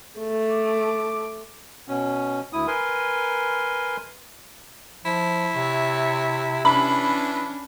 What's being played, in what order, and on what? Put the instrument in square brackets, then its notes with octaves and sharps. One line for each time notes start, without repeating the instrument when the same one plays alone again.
[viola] A3
[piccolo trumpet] D6
[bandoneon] B2 C#4
D2 E4 D#6
A#4 B4 G#5 C6
[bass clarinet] F3 [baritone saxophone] E4
[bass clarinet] C3 [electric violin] C#5
[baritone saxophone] E3 [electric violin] C#4 D4 [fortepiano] B5